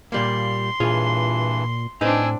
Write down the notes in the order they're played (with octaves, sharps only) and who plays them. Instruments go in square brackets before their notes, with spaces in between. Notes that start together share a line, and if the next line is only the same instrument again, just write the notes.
[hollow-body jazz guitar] A#2 G3 A#3 [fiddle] C6
[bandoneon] G2 E3 [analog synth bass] A#2 [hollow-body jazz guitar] F4 G#4 C#5
[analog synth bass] A2 [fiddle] C4 D4 [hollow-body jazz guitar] D#4 B4 [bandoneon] G#5 E6